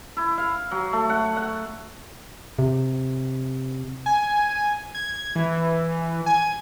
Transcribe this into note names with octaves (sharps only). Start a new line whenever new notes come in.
E4
F5
F#3
A3
F#5
F#5
C3
G#5
G#6
E3
G#5